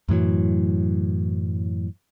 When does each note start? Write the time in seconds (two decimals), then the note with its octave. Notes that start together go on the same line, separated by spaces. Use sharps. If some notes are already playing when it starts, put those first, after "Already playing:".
0.09 F#2 A2 E3 F#3